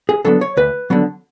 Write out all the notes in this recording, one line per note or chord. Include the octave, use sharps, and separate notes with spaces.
G#4
D3 F#3 B3 A4
C#5
D2 B4
D3 F#3 B3